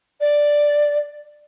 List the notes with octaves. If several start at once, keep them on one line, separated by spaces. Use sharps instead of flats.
D5